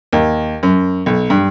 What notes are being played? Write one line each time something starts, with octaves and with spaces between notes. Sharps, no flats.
D#2
F#2
B1
G2